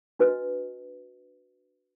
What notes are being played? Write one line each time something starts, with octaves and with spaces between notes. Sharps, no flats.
D4 F#4 B4 D#5